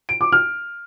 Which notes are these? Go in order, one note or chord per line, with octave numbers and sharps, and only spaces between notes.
D7
D6
F6